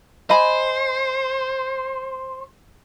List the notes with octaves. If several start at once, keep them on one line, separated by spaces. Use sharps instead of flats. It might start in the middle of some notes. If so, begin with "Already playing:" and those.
C5 D#5 G#5 B5